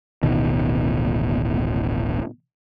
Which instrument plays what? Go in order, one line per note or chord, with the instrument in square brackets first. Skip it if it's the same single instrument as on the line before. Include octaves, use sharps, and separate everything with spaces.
[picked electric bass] D1 A1 B2 D#3